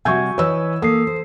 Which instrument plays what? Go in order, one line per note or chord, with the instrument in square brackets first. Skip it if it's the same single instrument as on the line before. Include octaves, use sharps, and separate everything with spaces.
[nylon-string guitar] C3 G3 F#4 [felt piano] E5 G6 G#6 [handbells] G#5 C#6
[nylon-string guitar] E3 D#5 [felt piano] B4 C#5 E6
[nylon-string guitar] A#3 [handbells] A4 C7 [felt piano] D#6
[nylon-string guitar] C5